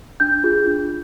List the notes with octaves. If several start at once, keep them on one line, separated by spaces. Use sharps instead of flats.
D4 G6
F4 G#4
D4